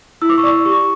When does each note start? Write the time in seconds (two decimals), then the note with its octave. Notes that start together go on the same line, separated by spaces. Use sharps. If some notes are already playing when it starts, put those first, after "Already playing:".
0.22 E4 E6
0.29 D6
0.38 C#6
0.43 D5 D6
0.66 G4 C#6